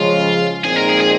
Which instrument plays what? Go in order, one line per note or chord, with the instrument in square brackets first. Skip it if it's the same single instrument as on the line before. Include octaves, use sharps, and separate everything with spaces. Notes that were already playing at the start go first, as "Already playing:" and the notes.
Already playing: [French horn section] C#3 F3 G#3 [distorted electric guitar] F4
[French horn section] A#2 F3 G#3 C4 D#4 [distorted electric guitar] G#4
[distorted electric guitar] A#4
G#4
G#4